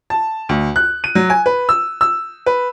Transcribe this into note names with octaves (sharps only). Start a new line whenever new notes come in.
A5
D2
F#6
D#7
F#3
G#5
B4
E6
E6
B4